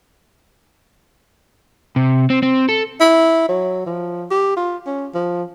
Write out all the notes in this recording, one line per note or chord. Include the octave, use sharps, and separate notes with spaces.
C3
C4
C4
A4
E4
F#3
F3
G4
F4
C#4
F3